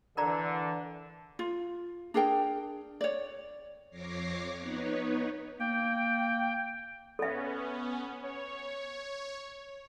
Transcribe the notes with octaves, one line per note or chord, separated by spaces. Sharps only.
D3 E3 A#4 D5 A#5
F4
D4 G#4 A#4 G5
C#5 D5
F2 C#5 D6 A#6 C7
B3 D#4 B4 C#5
A#3 G5
B3 C#4 A4 E5
C#5